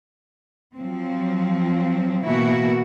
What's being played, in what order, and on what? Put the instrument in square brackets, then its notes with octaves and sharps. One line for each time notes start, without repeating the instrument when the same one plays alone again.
[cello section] F3 F#3 C4
B2 E3 A#3 E4 F#4